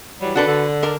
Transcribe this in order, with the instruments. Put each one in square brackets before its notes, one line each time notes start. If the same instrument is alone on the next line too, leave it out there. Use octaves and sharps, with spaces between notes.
[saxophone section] E3 F#3 G3
[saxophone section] D3 D#3 D4 [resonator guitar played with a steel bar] F#4 A4 B4
[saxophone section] D3
[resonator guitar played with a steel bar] D4 A#4 D5